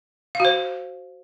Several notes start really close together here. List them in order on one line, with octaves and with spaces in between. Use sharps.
F5 F#4 C5